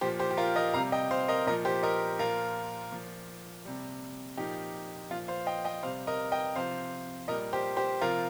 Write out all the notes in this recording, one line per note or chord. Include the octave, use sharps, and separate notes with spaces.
A#2 F3 G4 C5
G4 C5
G4
F4 A#4
A#4 D#5
C3 G3 F5 A#5
D#5 G5
C5 F5
A#4 D#5
A#2 F3 A#4 D#5
G4 C5
A#4 D#5
A#2 F3 F4 A#4
A#2 F3
C3 G3
A#2 F3 D#4 G4
A#2 F3 F4
C5 F5
D#5 G5
D#5 G5
C3 G3 C5 F5
A#4 D#5
D#5 G5
C3 F3 C5 F5
A#2 G3 A#4 D#5
G4 C5
G4 C5
C3 F3 F4 A#4